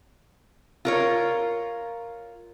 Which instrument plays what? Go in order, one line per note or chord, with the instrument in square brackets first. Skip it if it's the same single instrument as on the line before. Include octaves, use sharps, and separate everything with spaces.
[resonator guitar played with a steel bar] F4 A#4 C#5